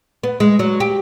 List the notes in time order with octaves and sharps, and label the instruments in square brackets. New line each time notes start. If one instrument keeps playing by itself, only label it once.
[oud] B3
G#3
F#3
G4